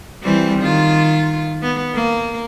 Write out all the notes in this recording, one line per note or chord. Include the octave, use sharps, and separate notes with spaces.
E3 G3 C4
D#3 F4
B3
A#3